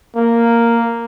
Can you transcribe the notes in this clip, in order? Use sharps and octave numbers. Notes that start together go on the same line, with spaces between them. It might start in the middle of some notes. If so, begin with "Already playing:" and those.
A#3